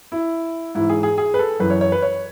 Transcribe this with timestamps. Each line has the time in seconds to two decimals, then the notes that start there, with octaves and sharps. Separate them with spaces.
0.12 E4
0.75 G#2 E3 E4
0.90 G#4
1.03 G#4
1.18 G#4
1.34 B4
1.39 A4
1.60 F#2 E3 B4
1.70 C#5
1.81 C#5
1.92 B4
2.02 C#5